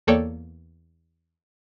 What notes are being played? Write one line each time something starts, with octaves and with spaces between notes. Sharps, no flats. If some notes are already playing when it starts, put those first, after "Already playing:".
E2 A#3 A4 C#5 D5 G5